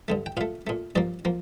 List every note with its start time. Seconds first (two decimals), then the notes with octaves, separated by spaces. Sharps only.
0.08 G2 D3 A3
0.26 G5
0.37 A#2 A3 F5
0.67 A#2 A3
0.95 G2 F3 A#3 D5
1.25 F3 A#3